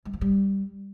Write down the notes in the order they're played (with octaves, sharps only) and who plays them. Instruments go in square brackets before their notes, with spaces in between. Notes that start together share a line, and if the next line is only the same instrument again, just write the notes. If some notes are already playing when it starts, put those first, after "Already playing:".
[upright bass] G#3
F3
G3